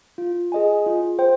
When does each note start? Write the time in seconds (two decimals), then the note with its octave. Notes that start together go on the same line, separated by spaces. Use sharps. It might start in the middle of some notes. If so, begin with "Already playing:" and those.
0.18 F4
0.52 G#4 D#5 G#5
0.86 F4
1.19 C5 G5